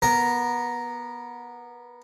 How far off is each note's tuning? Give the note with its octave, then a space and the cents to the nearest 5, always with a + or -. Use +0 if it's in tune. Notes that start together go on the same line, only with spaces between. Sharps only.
B3 -20 A#4 +0